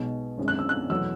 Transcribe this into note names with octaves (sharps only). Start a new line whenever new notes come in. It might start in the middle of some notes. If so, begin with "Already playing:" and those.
Already playing: B1 B2 G#3
G#1 F#2 D3 G#3
F#6
E6
F#6
E2 B2 F#3 A3 E6